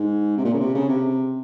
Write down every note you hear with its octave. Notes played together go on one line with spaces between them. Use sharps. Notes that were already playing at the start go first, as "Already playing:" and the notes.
Already playing: G#2
C3
A#2
C#3
C3
C#3
C3